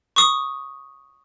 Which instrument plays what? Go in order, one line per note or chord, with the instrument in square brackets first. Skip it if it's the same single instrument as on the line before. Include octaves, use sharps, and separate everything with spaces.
[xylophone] C#6 D#6